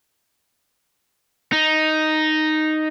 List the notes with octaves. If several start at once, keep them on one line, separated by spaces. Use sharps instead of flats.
D#4